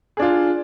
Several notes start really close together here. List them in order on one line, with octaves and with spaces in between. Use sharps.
G#4 D4 F4